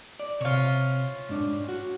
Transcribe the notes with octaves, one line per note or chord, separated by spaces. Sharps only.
D5
C3 C#4 F4
G#2 D4
F#4